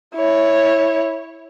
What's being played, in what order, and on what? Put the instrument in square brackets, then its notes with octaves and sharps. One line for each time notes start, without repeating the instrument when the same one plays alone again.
[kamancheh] E4 C#5